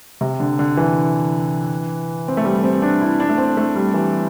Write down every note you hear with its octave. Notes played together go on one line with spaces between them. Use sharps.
C3
D3
D3
E3
C4
A3
G3
C4
D4
E4
D4
A3
C4
A3
G3
E3